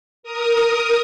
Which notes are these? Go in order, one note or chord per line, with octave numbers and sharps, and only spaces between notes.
A#4 D#6